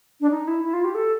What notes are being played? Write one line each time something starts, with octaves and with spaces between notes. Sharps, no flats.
D4
D#4
E4
E4
F4
G4
A4